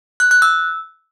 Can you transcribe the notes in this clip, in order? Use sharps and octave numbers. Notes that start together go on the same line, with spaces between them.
F#6
F#6
E6